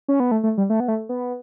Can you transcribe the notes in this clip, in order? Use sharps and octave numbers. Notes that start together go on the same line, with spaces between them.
C#4
B3
A3
A3
G3
A3
B3
A3
B3